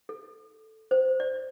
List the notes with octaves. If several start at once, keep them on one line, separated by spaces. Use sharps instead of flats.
A4
C5
D5